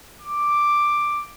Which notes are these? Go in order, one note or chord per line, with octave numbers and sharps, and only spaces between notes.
D6